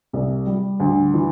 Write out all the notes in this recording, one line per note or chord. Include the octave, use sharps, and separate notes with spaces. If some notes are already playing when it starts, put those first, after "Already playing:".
C2
G3
D2
E3